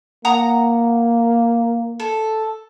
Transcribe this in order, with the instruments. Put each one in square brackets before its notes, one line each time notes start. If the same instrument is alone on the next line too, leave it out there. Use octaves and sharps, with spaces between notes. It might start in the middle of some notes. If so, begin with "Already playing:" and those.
[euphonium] A#3 [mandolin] F#5 A#5 D#6
[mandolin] A4